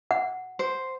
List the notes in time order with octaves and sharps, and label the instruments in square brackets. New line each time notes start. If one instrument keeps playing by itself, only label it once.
[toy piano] F#5
[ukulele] C5